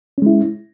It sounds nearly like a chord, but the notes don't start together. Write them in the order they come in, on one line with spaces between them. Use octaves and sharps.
C#4 G#3 E4